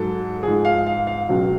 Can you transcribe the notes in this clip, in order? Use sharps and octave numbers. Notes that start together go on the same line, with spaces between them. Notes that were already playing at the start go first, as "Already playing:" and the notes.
Already playing: G#2 F#3 A4
G#2 F3 G#4
F5
F5
F5
C#2 B2 F#3